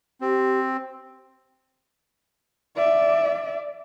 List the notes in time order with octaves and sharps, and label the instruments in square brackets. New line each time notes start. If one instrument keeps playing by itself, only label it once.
[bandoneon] C4 [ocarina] G4
[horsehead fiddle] D5 E5